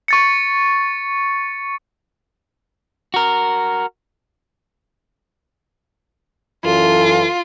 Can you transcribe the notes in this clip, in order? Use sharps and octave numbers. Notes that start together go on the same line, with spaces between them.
C#6 A6 C#7
F#4 A#4
F#2 E3 F4 A4